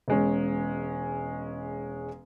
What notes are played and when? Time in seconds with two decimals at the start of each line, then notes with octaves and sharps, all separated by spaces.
0.08 E1 G#3 C#4